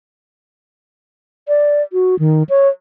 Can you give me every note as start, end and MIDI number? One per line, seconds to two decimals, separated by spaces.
1.48 1.82 74
1.93 2.18 66
2.19 2.43 51
2.49 2.68 73